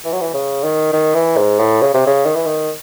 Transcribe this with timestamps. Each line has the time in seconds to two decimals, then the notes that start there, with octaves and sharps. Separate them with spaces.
0.05 E3
0.13 F#3
0.21 E3
0.34 C#3
0.64 D#3
0.93 D#3
1.15 E3
1.37 G#2
1.59 A2
1.82 C#3
1.94 C3
2.07 C#3
2.26 D#3
2.36 E3
2.46 D#3